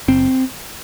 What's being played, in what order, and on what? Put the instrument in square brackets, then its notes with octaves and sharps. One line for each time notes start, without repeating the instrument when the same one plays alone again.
[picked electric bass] F#1 C4